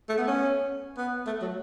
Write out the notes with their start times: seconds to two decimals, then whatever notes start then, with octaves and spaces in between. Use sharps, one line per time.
0.09 A3
0.18 B3
0.27 C#4
0.97 B3
1.27 A3
1.42 F#3